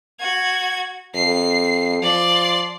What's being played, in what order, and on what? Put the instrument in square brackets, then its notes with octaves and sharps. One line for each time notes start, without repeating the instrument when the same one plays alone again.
[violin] F#4 G#6
[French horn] F2 [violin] C7
[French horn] F3 [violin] D5 C6